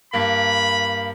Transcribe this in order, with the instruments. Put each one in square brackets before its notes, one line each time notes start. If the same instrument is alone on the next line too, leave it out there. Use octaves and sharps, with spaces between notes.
[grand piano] G2 A#3 [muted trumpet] B5